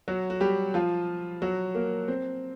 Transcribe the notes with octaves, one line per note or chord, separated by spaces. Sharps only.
F#3 F#4
F#4
G3 G4
F3 F4
F#3 F#4
A#3 A#4
C4 C5